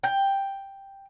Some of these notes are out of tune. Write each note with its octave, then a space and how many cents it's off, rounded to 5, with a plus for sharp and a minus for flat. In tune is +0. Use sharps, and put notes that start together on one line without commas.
G5 +5